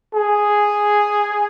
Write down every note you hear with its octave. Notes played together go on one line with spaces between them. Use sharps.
G#4